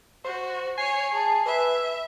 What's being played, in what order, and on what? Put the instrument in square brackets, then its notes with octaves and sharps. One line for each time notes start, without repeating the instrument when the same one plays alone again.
[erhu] F#4 [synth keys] C5
[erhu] C#5 [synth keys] G#5 C7
[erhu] G#4 [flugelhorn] A5
[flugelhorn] B4 [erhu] E5